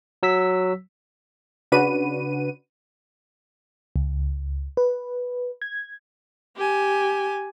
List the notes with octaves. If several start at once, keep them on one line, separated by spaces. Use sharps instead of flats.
F#3 E6 B6
C#3 D4 F#4 B4 D#7
C#2
B4
G#6
G4 G#5